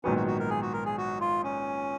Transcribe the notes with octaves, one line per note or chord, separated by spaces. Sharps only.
A#1 G#2 D#3 F#3 B3 C#4
F#4
F#4
A#4
G#4
F#4
A#4
G#4
F#4
F4
C#4